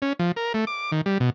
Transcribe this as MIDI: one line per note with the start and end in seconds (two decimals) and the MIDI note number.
0.02 0.13 61
0.19 0.32 53
0.36 0.53 70
0.54 0.65 57
0.67 0.91 86
0.92 1.01 51
1.06 1.18 55
1.20 1.30 47